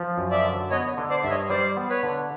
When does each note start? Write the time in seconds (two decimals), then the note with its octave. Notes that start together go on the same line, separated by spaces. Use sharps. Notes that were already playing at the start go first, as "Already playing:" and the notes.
Already playing: F3
0.18 F#2
0.31 D5 E5
0.45 D3
0.71 B3 C#5 D#5
0.97 D3
1.10 C5 D5
1.24 G2 E5
1.30 C#5 D#5
1.50 G3 C5 D5
1.76 B3
1.90 B4 C#5
2.03 D3